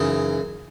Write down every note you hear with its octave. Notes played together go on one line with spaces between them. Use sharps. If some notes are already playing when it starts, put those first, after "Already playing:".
Already playing: F#2 C#3 E3 D#4